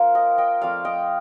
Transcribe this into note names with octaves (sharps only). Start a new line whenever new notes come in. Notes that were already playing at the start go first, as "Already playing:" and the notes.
Already playing: A#3 F4 A#4 C5
D#5 G5
D#5 G5
F3 A3 C4 D5 F5
D#5 G5